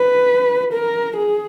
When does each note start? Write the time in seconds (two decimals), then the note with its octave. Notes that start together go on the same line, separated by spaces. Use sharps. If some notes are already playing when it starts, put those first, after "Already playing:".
Already playing: B4
0.73 A#4
1.17 G#4